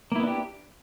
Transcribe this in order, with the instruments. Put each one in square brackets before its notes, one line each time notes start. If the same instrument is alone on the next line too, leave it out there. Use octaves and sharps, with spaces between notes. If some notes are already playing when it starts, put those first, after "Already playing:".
[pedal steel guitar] A#3
E4
B3
D4
G4